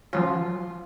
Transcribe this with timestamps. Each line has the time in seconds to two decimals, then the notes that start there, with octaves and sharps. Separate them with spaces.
0.13 F3 F#3 C#4 F4